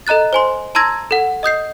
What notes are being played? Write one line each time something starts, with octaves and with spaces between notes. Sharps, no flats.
A4 D#5 A#5 F#6 A6
C5 G#5 C6
A5 A#5 C6 E6 G#6 A#6
A4 F#5
D#5 D#6 G6 C7